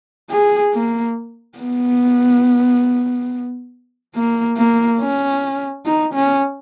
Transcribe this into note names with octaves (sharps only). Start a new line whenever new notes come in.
G#4
A#3
B3
A#3
A#3
C#4
D#4
C#4